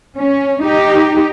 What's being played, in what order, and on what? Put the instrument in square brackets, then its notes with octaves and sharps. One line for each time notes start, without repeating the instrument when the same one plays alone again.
[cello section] C#4
D#4 G4